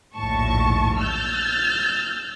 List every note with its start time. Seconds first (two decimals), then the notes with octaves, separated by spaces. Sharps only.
0.14 A#1 D#2 A2 A5 C#6
0.97 E6 F6 G6 A6